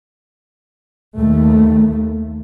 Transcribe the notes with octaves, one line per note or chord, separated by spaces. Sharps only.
D#2 A3